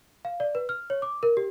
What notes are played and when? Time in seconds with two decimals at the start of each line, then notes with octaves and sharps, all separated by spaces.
0.25 F5
0.40 D5
0.55 B4
0.69 F6
0.90 C#5
1.02 D6
1.23 A#4
1.37 G4